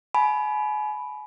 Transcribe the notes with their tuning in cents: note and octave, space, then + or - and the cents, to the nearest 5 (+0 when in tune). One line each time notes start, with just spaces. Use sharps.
G#5 +35 B5 +0